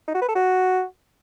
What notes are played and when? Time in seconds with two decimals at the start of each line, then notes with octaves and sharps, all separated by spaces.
0.08 D#4
0.15 F#4
0.22 B4
0.29 A4
0.36 F#4